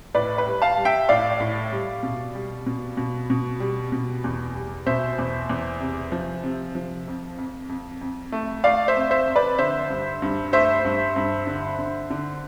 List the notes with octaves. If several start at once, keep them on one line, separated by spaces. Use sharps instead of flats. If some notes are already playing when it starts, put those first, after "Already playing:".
A2 B4 D5
B4
G3
F5 A5
G3
E5 G5
A2 D5 F5
A2
G3
B2
G3
B2
B2
B2
G3
B2
E2
G3
B2 C5 E5
E2
E2
C3
F3
C3
F3
F2
F2
F2
F2
A3
A3 D5 F5
C5 E5
F2
C5 E5
F2
B4 D5
D3 C5 E5
G2
G2
A3 C5 E5
G2
G2
D3
D3
D3